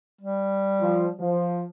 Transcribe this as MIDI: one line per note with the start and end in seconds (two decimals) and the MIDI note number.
0.21 1.19 55
0.81 1.06 53
1.19 1.64 53